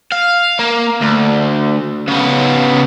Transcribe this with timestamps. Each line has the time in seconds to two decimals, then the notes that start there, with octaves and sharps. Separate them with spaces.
0.12 F5
0.59 A#3
1.01 D2
2.08 C#3 B3